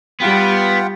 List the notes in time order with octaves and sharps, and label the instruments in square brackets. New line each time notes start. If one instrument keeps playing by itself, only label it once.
[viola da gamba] G3 [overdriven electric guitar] B3 [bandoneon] F4 F#5 G5